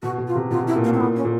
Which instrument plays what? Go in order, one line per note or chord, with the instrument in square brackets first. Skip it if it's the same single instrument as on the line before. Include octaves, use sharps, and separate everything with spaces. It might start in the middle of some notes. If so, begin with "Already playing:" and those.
[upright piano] B2 [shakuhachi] F#4
[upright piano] B2
[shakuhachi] F4
[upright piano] C3
[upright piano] B2 [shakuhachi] F4
[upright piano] B2 [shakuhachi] E4
[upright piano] A#2
[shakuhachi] A#3
[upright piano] A2
[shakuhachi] C4
[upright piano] A#2 [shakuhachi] B3
[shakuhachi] C#4
[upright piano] A#2